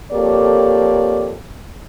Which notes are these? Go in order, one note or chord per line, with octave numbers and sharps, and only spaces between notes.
F2 A#3 G4 A4 C#5 D5